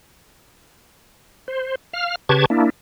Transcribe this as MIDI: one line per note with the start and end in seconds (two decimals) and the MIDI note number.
1.48 1.75 72
1.93 2.15 77
1.93 2.15 89
2.29 2.45 49
2.29 2.45 67
2.29 2.45 71
2.29 2.45 81
2.29 2.45 85
2.29 2.45 92
2.50 2.70 58
2.50 2.70 62
2.50 2.70 64